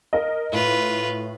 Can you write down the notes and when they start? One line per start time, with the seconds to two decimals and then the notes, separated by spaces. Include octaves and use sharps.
0.13 A#4 D#5
0.52 A2 F4 B4